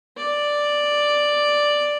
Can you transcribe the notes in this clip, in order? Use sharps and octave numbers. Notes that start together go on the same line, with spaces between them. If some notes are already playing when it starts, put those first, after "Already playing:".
D5